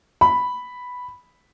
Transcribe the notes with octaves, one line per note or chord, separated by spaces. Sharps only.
B5